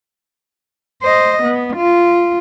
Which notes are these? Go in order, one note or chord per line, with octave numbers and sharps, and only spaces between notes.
C5 D#5
B3
F4